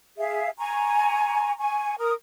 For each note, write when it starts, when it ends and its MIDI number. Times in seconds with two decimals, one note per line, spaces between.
0.18 0.49 68
0.18 0.49 76
0.18 0.49 77
0.58 1.53 80
0.58 1.53 82
0.58 1.53 85
1.58 1.95 80
1.58 1.95 85
1.98 2.13 70
1.98 2.13 87